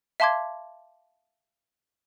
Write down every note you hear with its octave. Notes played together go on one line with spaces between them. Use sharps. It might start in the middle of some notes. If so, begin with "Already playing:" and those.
E5 F5 A5 C6 D6 G#6